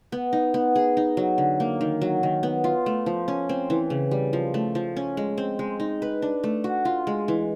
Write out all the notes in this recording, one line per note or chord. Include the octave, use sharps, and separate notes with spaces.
B3
D#4
B3
G#4
D#4
F#3
D3
A#3
D#3
F#3
D#3
B3
F4
A3
F3
C#4
C4
E3
C#3
G3
F3
A3
F3
C#4
G#3
C4
G#3
D#4
B4
D4
A3
F#4
F4
G#3
E3